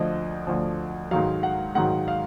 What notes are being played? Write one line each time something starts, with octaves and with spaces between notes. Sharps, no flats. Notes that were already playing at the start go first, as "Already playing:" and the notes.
Already playing: D2 D3 F3 D#5
D2 D3 F3
G#2 D#3 F#3 F5
F#5
G#2 D#3 F#3 F#5
F5